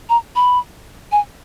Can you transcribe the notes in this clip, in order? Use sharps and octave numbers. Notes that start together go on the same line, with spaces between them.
A#5
B5
G#5